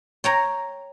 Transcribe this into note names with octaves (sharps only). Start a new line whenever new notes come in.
C#5 G5 A#5